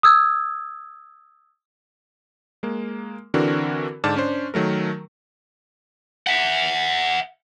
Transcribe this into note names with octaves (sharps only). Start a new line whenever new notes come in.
D#6 E6 G#6
G#3 A#3
D3 E3 C4 D4 F#4 A#4
G#2 D3 D5 A5 F6
C#4 D4 C5
D#3 F#3 A3 A#4
E5 F#5